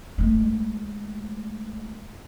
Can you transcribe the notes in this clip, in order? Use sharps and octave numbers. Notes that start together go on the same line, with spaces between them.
G#3 A3